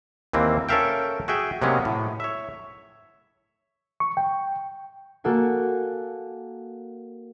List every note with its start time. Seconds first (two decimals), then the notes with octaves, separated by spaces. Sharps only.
0.33 D#2 E3 A#3 C4
0.69 C#4 A4 A#4 E5 F5 G5
1.28 F#4 G#4 E5 G5
1.62 C3 F#3 G#3 A#3 B3 C#4
1.85 A2
2.20 C#5 E5
4.00 C#6
4.17 G5
5.24 A#3 F#4 A4 F#5 G#5